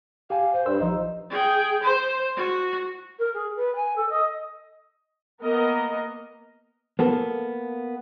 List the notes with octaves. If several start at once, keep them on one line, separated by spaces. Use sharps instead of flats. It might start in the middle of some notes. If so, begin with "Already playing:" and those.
G4 F5 G#5
C5
G2 B4 C6 E6
A#1 F3 D#4
G#4 G5
C5
F#4
A#4
G#4
B4
G#5
A4
D#5
A#3 B3 A#4 D#5
A#3 B3 A4